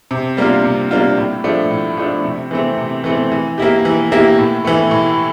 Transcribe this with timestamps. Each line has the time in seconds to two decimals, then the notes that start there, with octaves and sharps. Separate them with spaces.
0.11 C3
0.37 G3 A#3 D4 F4
0.64 C3
0.91 G3 A#3 D4 F4
1.17 A2
1.44 F3 A3 D4
1.71 A2
1.97 F3 A3 D4
2.24 C3
2.51 E3 A3 C4
2.78 C3
3.04 E3 A3 C4
3.32 E3
3.58 A#3 E4 G4
3.85 E3
4.12 A#3 E4 G4
4.38 A2
4.65 E3 A3
4.91 A2